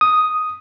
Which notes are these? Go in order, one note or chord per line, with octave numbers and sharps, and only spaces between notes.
D#6